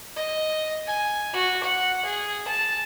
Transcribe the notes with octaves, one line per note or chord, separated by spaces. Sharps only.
D#5
G#5
F#4
F#5
G#4
A5